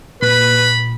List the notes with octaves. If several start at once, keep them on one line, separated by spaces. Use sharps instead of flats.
A#2 B4 B5